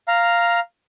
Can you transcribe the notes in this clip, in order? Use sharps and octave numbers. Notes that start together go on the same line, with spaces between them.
F5 A#5